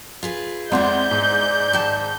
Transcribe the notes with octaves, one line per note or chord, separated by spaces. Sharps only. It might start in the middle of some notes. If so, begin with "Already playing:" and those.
F4 G#4 B4
F2 G#3 B3 E4 D5 F#5 C6 G6
G#2
D#3 G5 A5